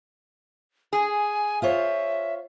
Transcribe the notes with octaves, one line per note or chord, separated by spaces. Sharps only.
G#4 G#5
F4 C5 C#5 E5